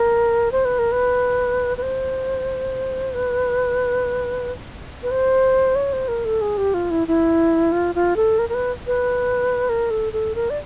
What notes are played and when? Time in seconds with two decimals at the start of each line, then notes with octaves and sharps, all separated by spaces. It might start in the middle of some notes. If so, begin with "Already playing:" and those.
Already playing: A#4
0.52 C5
0.65 B4
0.79 A#4
0.92 B4
1.77 B4
1.82 C5
3.14 B4
5.03 B4
5.11 C5
5.75 C#5
5.93 C5
6.08 A#4
6.25 A4
6.41 G#4
6.57 G4
6.74 F4
6.91 E4
7.08 E4
7.72 F4
7.95 F4
8.16 A4
8.39 A#4
8.49 A#4
8.54 B4
8.87 B4
9.69 A#4
9.90 A4
10.13 A4
10.35 A#4
10.50 D5